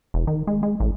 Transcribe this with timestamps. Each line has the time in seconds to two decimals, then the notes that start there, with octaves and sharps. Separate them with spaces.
0.14 E1
0.27 D#3
0.47 G#3
0.63 G#3
0.80 A1